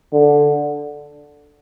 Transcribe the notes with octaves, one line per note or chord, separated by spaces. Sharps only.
D3